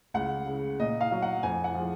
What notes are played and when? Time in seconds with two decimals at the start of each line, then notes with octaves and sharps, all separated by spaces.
0.14 C#2 F#5
0.46 C#3 G#3
0.79 A#2 D#5
1.01 F5
1.12 F#3
1.22 F#5
1.43 F2 G#5
1.64 F#5
1.75 F3 G#3